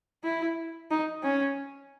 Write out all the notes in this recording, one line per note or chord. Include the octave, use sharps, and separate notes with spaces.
E4
D#4
C#4